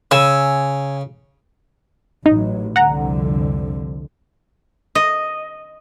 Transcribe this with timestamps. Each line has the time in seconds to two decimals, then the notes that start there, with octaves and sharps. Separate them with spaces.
0.11 C#3 G#5 E6
2.26 A1 F#3 D#4
2.76 C2 F2 D3 F#5 A#5
4.95 D#5